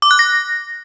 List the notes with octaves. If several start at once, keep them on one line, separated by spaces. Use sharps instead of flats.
D6
F#6
A#6